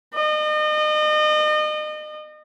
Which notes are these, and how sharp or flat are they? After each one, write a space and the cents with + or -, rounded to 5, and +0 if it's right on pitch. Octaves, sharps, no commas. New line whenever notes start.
D#5 -35